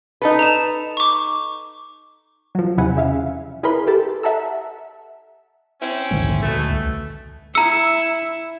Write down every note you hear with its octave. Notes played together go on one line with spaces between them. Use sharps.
D#4 A4 B4
A#5 E7
C#6 D6
F3 F#3
E2 C3 E4 F#5 G#5
C#3 E5 F5
E4 G#4 A#4 B4 B5 C6
G4 A4 A5
E5 F#5 A5 A#5 E6
C4 C#4 E4
A#1 D#2 G#2 D3
D2 B2 A3
C2
E4 A#5 E6 C#7